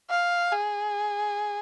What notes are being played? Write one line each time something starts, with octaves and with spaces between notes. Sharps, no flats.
F5
G#4